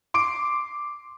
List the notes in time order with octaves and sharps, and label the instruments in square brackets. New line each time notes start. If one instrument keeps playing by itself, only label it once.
[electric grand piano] C6 D6 D7